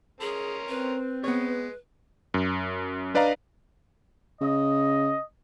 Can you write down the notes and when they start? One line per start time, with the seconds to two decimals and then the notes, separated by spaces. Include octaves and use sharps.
0.21 C#4 G#4 A#4 C6
0.69 C4 B4
1.24 G#3 B3 B4 C#5
2.34 F#2
3.14 D4 B4 D5 D#5 F5 A#5
4.41 C#3 D#5